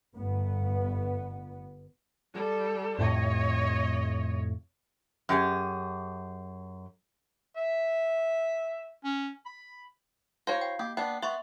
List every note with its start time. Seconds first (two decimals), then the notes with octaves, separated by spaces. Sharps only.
0.16 G1 B3
2.34 G3 A4
2.98 F2 A2 C3 C#5 D#5
5.29 F#2 G4 G#4
7.57 E5
9.04 C#4
9.46 B5
10.47 E4 F#4 C5 C#5 F5
10.61 G5
10.79 A#3 G4
10.97 B3 D4 G5
11.22 B3 E5 C6 C#6